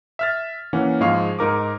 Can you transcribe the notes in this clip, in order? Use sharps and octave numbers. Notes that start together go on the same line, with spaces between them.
E5 F6 A6
E3 A#3 C#4 F#5
G#2 F3 G#3 G#4 F5 C#6
G#2 D#4 A#4 D6